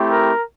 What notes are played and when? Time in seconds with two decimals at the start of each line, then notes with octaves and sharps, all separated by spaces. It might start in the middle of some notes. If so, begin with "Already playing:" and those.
Already playing: A3 C4 E4 G4
0.10 A#4